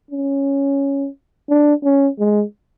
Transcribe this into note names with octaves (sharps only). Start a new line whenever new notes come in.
C#4
D4
C#4
G#3